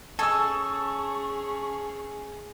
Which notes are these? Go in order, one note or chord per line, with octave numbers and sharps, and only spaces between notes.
C#4 G#4 A4 D#5 G#5 A5 C#6 E6